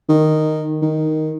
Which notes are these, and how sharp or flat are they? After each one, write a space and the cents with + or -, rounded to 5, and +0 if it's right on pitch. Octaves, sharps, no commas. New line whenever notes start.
D#3 -5
D#3 +5